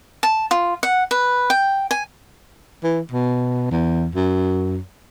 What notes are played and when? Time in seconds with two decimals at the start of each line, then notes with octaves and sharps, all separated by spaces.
0.23 A5
0.51 F4
0.83 F#5
1.11 B4
1.50 G5
1.91 G#5
2.84 E3
3.12 B2
3.71 E2
4.15 F#2